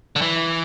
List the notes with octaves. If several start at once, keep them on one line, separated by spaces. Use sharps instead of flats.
D3
E3